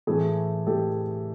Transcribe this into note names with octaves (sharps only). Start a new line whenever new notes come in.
A2 E3 A3 G#4
A2 E3 A3 G4 A4